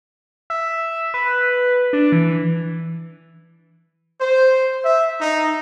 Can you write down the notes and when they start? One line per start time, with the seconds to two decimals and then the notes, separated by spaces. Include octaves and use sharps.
0.50 E5
1.14 B4
1.93 D4
2.12 E3
4.20 C5
4.84 E5
5.21 D#4